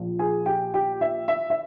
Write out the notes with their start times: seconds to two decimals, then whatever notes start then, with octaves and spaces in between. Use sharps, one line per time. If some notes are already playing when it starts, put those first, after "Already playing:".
Already playing: A#1 A#2 F3
0.19 G#4 G#5
0.46 G4 G5
0.74 G4 G5
1.01 E5
1.28 E5
1.50 E5